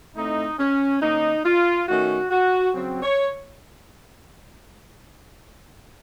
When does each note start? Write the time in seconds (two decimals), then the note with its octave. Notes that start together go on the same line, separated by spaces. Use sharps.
0.16 A2 A3 C4 D#4
0.59 C#4
1.02 D#3 A#3 C#4 D#4
1.45 F4
1.88 D#3 A3 C#4 F#4
2.31 F#4
2.74 C#3 F#3 C4
3.02 C#5